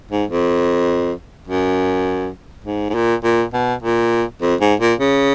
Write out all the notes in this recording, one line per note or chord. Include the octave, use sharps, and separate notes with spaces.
G#2
F2
F#2
G#2
G#2
A#2
A#2
B2
A#2
F2
G#2
A#2
C#3